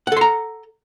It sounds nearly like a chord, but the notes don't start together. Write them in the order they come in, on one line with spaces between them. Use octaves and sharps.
F#5 A4 C6 A#5